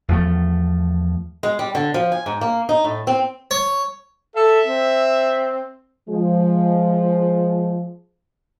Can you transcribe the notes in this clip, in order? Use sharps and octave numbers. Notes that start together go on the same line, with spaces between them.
E2 F3 A3
G#3
G3
D3
F3
G#5
G#2
A#3
D#4
A2
C4
C#5
A4 E5
C4
F3 G#3